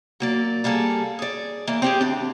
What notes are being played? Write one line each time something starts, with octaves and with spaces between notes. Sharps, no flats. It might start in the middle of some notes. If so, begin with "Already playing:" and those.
F#3 A#3 D5
G3 A#3 G#4 A4
G#4 D5
E3 A#3
C4 G4 G#4
D2 D4